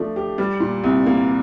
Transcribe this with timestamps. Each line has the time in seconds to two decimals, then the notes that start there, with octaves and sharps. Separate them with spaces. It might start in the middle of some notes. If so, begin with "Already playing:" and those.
Already playing: F3 A3 D4
0.16 G4
0.38 G3
0.60 A#2
0.84 C2
1.06 A#3